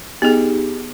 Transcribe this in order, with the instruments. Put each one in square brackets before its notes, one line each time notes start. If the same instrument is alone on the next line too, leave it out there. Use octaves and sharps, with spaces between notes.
[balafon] B3 G#4 [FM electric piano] D#4 G4